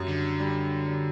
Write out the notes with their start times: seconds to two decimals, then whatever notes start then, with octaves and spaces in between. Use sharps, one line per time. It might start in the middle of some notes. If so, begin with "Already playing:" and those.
Already playing: F#2 G3
0.08 D3
0.40 G3
0.86 G3